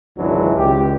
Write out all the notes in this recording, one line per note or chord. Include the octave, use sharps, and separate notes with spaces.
G#1 C#2 E3 F#3 G#3 D4
C#2 G4